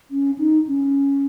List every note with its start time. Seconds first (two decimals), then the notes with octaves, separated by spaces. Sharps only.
0.11 C#4
0.38 D#4
0.67 C#4